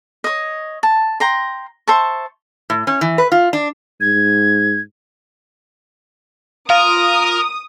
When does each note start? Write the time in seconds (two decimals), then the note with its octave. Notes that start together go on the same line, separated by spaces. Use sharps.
0.24 C#5 D#5
0.83 A5
1.20 G5 A#5 C6
1.87 C5 E5 A5 C#6
2.70 A2
2.87 C#4
3.01 E3
3.18 B4
3.32 F4
3.53 D4
4.01 G#2 G#6
6.70 F4 A#4 D#6